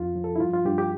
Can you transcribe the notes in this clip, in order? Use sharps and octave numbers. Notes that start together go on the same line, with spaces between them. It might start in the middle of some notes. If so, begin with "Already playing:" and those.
Already playing: F2 F4
F3
A4
E4
G2 F4
F4
G2 G4
G4